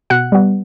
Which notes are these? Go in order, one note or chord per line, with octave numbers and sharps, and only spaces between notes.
B2 F#5 F#6
G3 B3